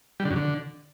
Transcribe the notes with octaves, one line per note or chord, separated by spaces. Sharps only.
G3
D3
F#2
D3